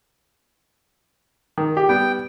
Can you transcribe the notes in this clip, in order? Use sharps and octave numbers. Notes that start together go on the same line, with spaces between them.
D#3
G4
G3 B3 G5